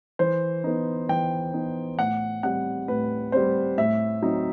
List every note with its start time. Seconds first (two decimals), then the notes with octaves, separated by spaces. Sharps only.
0.19 E3 C5
0.64 B3 D#4
1.09 E3 G5
1.54 B3 D#4
1.98 A2 F#5
2.43 G3 C4 F#5
2.88 A2 B4
3.32 G3 C4 C5
3.78 A2 E5
4.22 F#3 C4 D#4